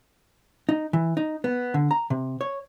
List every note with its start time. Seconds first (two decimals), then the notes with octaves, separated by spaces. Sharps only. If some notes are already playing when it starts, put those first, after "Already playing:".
0.69 D#4
0.93 E3
1.17 D#4
1.44 B3
1.74 D3
1.91 A#5
2.10 C3
2.41 C#5